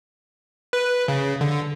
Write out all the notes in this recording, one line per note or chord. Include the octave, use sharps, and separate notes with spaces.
B4
C#3
D3